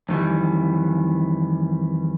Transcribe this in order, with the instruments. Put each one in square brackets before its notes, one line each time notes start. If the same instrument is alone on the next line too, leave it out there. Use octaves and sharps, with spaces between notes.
[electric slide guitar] F2 D#3 E3 G3